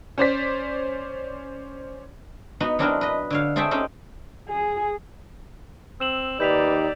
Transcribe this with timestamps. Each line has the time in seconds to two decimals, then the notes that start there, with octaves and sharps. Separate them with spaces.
0.18 C#4 C5 D5 B6
2.60 B3 D#4 F#4 B4
2.79 F#3 C4 D4 E4 A#4 D#5
3.01 B4 D#5
3.30 D3 C#5 F5
3.56 A3 C4 G#4 E5 G5 A5
3.71 C4 C#4 D#4 G4
4.49 G#4
6.00 C4 E6 E7 F#7
6.40 D#2 D#4 G4 B4 D5 G6 B6 F7